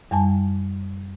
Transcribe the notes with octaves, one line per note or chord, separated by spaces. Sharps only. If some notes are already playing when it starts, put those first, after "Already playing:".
F#2 G3 G#5 A5